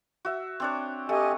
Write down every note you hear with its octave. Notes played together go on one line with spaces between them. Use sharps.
F#4 E5
C4 D4 C#5
A3 G4 D#5 G#5